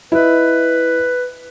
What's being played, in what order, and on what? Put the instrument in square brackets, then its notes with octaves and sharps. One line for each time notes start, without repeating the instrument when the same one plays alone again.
[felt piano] E4 D#5 [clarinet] B4